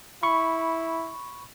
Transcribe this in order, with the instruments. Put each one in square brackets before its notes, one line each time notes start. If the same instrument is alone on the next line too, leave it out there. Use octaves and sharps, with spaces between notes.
[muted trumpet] E4 [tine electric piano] B5 C#6